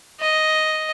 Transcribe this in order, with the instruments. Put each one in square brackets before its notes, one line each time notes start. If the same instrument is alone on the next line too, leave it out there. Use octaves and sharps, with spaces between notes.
[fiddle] D#5